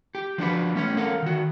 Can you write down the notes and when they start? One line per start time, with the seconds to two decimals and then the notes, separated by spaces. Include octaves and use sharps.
0.15 G4
0.38 F3 D4 F#4 B4
0.75 A3 C#4 C#5
0.97 A4 A#4 F5 F#5
1.22 D#3 F#4